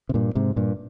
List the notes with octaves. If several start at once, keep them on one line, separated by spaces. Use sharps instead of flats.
C3
G2 A#2
G#2 C3
G2 A#2